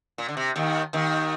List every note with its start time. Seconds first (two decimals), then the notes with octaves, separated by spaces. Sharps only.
0.18 A#2
0.28 D3
0.37 C3
0.56 D#2 D#3
0.93 D#2 D#3